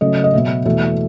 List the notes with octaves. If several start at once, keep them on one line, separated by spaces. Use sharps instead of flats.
C#3 F#3 A3 D#5
D#5
B2 F#3 B3 E5
E2 B2 A3 E5